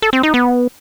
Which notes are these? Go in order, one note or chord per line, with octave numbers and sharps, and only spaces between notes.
A4
C4
D#4
B3